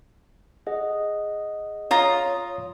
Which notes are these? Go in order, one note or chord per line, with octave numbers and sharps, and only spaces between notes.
G#4 D#5 F#5
F4 C#5 A#5 D#6